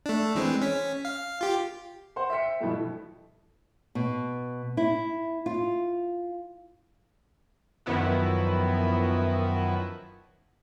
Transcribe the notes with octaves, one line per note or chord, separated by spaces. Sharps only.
A3 D4
E3 G#3 C4
C#4 B6
F5
F4 G4
C5 F#5 C6
E5 G5 B6 C#7
G2 B2 E3 F3 A3
B2
E4
F4
F#2 D#3 F3 B3 E4 F#4